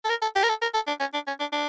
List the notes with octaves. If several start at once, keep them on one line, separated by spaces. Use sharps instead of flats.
A4
A#4
A4
G4
A#4
A4
A#4
A4
D4
C#4
D4
C#4
D4
D4